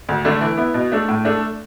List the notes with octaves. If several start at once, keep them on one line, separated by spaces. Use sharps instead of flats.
D2
D3 A3 D4
E3
B3 E4
B2
A3 D4 A4
A2
A3 D4 A4